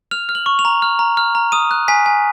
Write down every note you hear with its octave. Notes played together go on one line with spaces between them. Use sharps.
F6 F7
F6
F#7
C#6
F7
A#5
F6
A#5
F6
A#5
D#6 D#7
F#6
G#5 B6
G#5